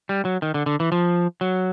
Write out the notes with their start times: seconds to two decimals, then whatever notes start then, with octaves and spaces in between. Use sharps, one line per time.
0.09 G3
0.25 F#3
0.42 D#3
0.54 D3
0.66 D3
0.80 E3
0.92 F3
1.41 F#3